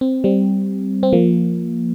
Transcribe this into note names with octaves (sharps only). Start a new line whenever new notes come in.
C4
G3 C4
C4
F3 A#3